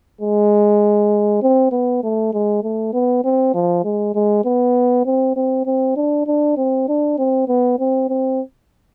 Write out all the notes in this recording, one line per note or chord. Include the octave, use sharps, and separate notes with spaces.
G#3
C4
B3
A3
G#3
A3
B3
C4
F3
G#3
G#3
B3
C4
C4
C4
D4
D4
C4
D4
C4
B3
C4
C4